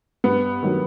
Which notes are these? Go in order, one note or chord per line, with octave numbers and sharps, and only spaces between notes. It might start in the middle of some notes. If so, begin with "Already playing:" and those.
G2 B3
D#3 F#3